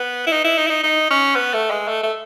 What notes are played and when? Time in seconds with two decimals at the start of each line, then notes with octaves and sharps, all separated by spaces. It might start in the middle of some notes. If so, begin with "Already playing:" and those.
Already playing: B3
0.27 E4
0.32 D#4
0.44 E4
0.57 D#4
0.67 E4
0.70 D#4
0.83 D#4
1.10 C#4
1.36 B3
1.54 A3
1.70 G#3
1.88 A3
2.03 A3